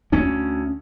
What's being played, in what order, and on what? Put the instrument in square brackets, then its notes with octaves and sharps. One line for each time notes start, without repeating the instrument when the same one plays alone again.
[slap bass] D2 C#4